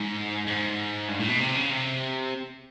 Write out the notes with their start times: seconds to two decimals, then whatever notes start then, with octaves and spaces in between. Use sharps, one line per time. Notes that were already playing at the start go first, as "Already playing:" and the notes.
Already playing: G#2
0.47 G#2
1.08 G2
1.19 A2
1.29 B2
1.40 C3
1.55 C#3
1.71 C3